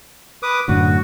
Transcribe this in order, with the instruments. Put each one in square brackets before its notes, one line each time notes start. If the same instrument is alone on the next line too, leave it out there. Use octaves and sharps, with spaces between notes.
[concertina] B4 D6 D#6
[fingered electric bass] F#2 A2 D3 [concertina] F#4